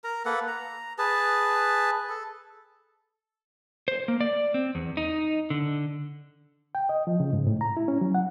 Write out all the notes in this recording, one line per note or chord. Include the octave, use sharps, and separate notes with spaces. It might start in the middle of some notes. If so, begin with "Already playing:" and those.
A#4 A#5
A#3 A4 B4 F#5
A#5
G#4 B4 A5
A4
C5
A#3
D5
C4
E2
D#4
D3
G5
D#5
F3
C#3
G#2
A2
A#5
E4
C#4
F#3
F#5